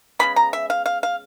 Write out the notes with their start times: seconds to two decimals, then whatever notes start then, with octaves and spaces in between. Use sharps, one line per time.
0.19 C#3 F3 G#3 B3 B5
0.36 A#5
0.53 E5
0.70 F5
0.86 F5
1.03 F5